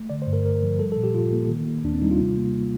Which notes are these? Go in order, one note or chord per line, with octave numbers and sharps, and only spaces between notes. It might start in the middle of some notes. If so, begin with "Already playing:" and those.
Already playing: A3
D3 D5
C5
G2
A#4
G2 A#4
F3
G3 A4
A4
A#2
G4
A#2 F4
A#3
D#3
A#3
D#2 D4
C4
G3 D#4
F4
C3
A#3